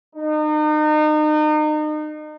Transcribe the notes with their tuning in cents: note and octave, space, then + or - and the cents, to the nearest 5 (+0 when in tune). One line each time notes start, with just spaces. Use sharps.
D#4 -35